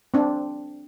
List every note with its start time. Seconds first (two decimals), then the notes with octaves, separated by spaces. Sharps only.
0.14 C4 D4